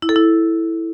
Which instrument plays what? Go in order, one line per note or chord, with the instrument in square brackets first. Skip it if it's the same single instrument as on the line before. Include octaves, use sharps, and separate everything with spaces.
[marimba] E4
A4
E4